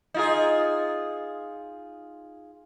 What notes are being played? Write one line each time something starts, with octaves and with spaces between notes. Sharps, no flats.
D#4 F4 G#4